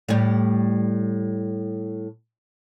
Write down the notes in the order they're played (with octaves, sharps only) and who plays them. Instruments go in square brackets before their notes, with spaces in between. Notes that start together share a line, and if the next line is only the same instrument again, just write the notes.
[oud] A2 G3